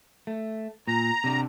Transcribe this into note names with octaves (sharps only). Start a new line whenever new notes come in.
A3
A#2 A#5
C3 D4